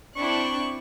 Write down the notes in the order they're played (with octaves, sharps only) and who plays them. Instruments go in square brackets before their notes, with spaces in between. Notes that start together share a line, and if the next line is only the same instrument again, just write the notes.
[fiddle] C4 F#6 [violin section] D4 E4 [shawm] C#6